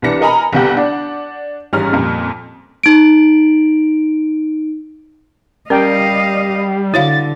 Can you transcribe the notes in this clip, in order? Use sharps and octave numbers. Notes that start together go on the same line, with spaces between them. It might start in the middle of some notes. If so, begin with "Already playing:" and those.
C2 E3 D4 A#6 C#7
A#4 D#5 G#5 A#5 B5
G1 C2 C3 G4 F#5 G6
D4 D5 F#5
A1 G#2 G3 C#4 F6
F2 A#2 G3
D#4 D7
G3 C#4 A#4 D#5 F5 G5
D3 E4 F#4 C#5 F5 A6